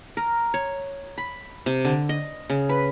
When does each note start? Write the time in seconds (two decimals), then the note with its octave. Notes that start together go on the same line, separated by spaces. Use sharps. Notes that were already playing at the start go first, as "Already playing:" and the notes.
0.17 A#4
0.54 C#5
1.18 B5
1.66 C3
1.85 D3
2.09 D#5
2.50 C#3
2.69 B4